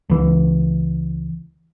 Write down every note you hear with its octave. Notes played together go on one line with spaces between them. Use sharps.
C#2 E3